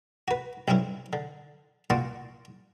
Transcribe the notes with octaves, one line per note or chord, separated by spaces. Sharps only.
F#4 B4
B1 G2 C4 C#4 E4
D3
A#2 F#4 D5 C6 C#6